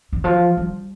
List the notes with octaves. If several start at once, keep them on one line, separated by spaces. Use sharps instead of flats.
D#3
F3
G3